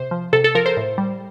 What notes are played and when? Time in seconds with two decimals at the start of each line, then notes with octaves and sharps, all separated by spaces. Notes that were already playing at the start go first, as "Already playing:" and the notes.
Already playing: C3 C5
0.11 F3
0.33 C3 A4
0.44 A4
0.55 F3 A#4
0.66 C5
0.77 A2
0.98 G3